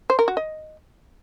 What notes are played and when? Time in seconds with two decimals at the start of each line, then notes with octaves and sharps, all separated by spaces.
0.10 C5
0.19 A#4
0.28 F#4
0.37 D#5